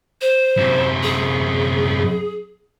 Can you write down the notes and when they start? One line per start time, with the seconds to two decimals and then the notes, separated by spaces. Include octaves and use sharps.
0.21 C5
0.57 F#2 C3
1.03 G#4